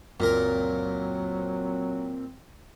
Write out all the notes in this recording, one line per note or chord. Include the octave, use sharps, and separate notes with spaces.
C#2 F#2 A#2 F#3 C4 A#4